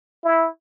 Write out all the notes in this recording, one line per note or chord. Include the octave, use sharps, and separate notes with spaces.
E4